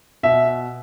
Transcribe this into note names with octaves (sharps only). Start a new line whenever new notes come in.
B2 E5